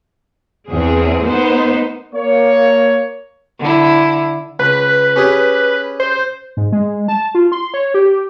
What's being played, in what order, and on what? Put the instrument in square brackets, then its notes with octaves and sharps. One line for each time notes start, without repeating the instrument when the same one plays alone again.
[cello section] E2 C4 G#4
A#3 B3 D#4 C5
[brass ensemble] A#3 C#5
[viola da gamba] D3 E4
[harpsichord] C#2 [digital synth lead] B4
[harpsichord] C#4 G4 G#4
[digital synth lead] C5
[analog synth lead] G#2
G#3
A5
F4
C6
C#5
G4